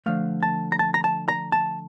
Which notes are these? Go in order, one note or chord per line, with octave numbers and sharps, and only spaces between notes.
D3 F3 A3 F5
A5
A#5
A5
A#5
A5
A#5
A5